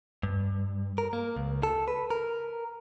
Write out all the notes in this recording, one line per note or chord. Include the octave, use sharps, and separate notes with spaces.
G2
A#4
A#3
C#2
A4
B4
A#4